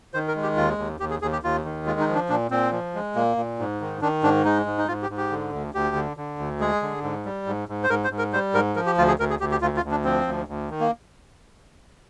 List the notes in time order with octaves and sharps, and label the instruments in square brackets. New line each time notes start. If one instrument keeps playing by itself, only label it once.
[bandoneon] D#3 C5
A#4
G#3
G4
D#2 F4
D#2
D#2 G4
G#4
D#2 G#4
G4
D#2 F4
D#3
G#3 F4
D#4
F3
D4
A#2 D4
A#2 C4
F3
G#3
A#2 A#3
A#2
G#2
D#3
D#3 D4
G#2 D4
G#3 D#4
G#2
D#4
G#2 F4
G4
G#2
G4
D3
D2
D2 G4
D3
D3
D2
G#3 G#4
D3
G#2
G3
G#2
G#2
C5
G#2 A#4
C5
G#2
A#4
G3 C5
G#2 A#4
F3 A#4
G4
D2 F4
G#4
D2 A#4
G#4
D2 G4
G4
D2 F4
F4
D2
D4
F3 C4
D2
D2
D#3
A#3